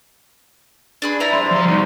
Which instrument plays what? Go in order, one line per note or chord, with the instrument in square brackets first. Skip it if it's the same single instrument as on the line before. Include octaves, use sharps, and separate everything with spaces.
[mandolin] D4 G#4 B5
[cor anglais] E4 [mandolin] D5 E5 A#5
[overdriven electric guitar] C3 [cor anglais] C5
[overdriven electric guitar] F3 C6
C2 D#4